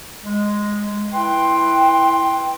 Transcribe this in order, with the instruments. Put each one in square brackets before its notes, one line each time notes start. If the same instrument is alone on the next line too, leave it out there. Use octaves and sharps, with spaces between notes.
[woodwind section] G#3
[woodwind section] E4 B4 C6 [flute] G5